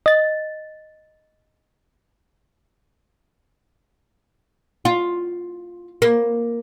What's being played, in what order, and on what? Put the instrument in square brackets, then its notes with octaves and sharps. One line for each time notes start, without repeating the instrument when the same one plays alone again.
[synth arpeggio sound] D#5 A6
[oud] F4
A#3